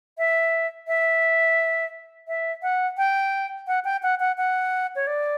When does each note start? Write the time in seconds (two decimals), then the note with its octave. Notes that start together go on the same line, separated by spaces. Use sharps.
0.18 E5
0.87 E5
2.28 E5
2.62 F#5
2.97 G5
3.67 F#5
3.85 G5
4.03 F#5
4.20 F#5
4.38 F#5
4.96 C#5
5.07 D5